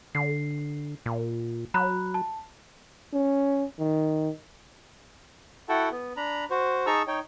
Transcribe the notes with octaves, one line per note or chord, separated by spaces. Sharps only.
D3 C7
A#2
F#3 A#5 B5 F#6
A5
C#4
D#3
E4 F#4 A4 F#5 G5 A5
B3
D4 A#5 B5
F#4 C5
D#4 G#4 A5 A#5 C#6 E6
D#4 C#5 G5